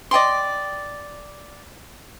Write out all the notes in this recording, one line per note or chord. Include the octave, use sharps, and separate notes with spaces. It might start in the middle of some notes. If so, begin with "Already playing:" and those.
D5 D#5 G5 C6